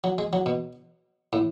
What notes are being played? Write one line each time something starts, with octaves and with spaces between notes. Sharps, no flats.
F#3
G#3
F#3
B2
A2